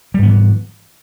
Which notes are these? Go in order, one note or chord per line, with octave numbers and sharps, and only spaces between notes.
G#2 E3 G3 B3